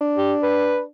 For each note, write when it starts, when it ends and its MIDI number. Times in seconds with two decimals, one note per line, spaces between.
0.01 0.87 62
0.16 0.34 67
0.43 0.80 71